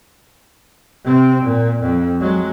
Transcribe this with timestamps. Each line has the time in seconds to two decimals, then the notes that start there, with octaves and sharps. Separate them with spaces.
1.05 C3 C4
1.43 A#2
1.81 F2
2.20 F#3 G#3